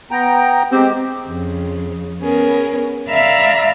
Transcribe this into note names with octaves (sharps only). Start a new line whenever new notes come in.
B3 G5 A#5
G#3 C4 G4
F2 C#3
B3 C#4 G#4 A#4
D5 E5 F5 A#5 B5 E6